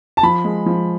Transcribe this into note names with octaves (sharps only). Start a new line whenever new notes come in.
A5
F3 B5
G#3
F3